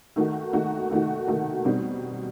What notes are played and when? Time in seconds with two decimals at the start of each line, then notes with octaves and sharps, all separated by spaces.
0.16 D#3 A3 D#4 F#4
0.53 D#3 A3 D#4 F#4
0.90 D#3 A3 D#4 F#4
1.28 D#3 A3 D#4 F#4
1.65 B2 G3 C4 D#4